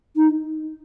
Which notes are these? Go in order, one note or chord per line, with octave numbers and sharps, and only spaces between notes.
D#4